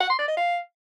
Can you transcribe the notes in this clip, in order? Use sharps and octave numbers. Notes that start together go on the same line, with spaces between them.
F#5
C6
D5
D#5
F5